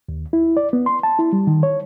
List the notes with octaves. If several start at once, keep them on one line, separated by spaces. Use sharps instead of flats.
D#2
E4
D5
B3
C6
A5
E4
G3
D#3
C#5